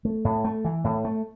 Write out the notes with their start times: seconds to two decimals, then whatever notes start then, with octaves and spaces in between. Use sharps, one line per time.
0.05 A3
0.25 A2
0.44 A3
0.65 E3
0.84 A2
1.05 A3